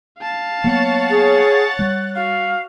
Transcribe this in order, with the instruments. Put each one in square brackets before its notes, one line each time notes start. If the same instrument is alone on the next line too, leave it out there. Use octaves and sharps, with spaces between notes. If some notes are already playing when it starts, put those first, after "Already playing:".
[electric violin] F5 A5
[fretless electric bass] F#3 A#3 B3 [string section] C#5 F#5 A6
[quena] G#4
[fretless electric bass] G3 [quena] F#6
[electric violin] F#4 [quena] F5